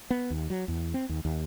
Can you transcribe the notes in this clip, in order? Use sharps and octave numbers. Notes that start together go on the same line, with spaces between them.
B3
D#2
F#3
E2
C4
D#2
D#2